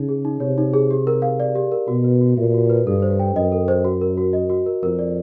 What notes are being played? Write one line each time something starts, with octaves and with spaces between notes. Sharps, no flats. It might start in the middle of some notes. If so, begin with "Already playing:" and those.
Already playing: C#3 D#4
G#4
D#4
C3 C#5
D#4
G#4
G4
A#4
F5
D5
G4
A#4
B2 F#4
B4
F#4
A#2 E5
F#4
B4
G2 A4
C5
G5
F#2 D#5
A4
C5
F#4
A#4
F#4
D#5
F#4
A#4
F2 A#4
D5